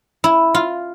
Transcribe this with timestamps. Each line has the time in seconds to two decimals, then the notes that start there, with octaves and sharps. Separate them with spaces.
0.24 E4
0.55 F4